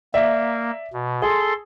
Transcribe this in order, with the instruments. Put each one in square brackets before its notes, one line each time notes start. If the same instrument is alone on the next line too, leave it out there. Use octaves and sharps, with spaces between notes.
[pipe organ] A#3 [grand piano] D5 E5
[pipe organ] B2
[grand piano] G#4 [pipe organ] A4 C6